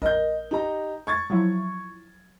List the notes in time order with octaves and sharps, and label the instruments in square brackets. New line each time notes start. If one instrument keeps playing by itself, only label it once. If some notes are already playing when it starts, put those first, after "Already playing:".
[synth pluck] A#1 A#4 [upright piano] D#5 G6
[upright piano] D#4 G4 A#5
C#6 G#6 A6
[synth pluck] F3 F#3 E4